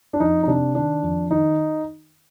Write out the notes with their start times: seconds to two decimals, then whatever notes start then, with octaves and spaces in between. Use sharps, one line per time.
0.13 D4
0.20 F2 D#4
0.43 D#4
0.48 C3 D4
0.75 D#3 D4
1.03 F2
1.30 D#3 D#4